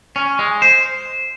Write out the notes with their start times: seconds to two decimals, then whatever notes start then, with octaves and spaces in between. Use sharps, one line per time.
0.16 C#4
0.39 G#3
0.62 C5